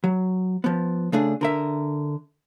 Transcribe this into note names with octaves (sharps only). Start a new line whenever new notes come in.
F#3
F3 B3
C#3 A3 D4 G#4
D3 A#4 E5